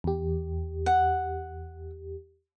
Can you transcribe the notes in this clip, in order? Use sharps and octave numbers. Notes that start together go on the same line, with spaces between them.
E2 G4
F#5